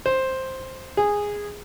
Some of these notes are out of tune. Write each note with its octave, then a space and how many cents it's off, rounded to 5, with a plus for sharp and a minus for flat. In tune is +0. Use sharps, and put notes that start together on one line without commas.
C5 +5
G#4 -10